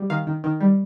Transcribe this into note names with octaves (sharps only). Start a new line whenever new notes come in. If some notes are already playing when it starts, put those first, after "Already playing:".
Already playing: G3
D#3 F5
D#3
D#3
G3